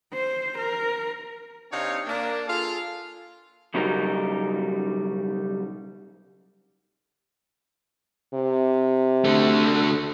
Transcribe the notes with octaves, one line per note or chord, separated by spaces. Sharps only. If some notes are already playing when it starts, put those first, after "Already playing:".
C5
A#4
C3 C4 D4 D#4 C#5 F5
A#3 D4
F4 G#4 A4 F5
B1 C#3 F#3 G3 D#4 A#4
C3
D3 A3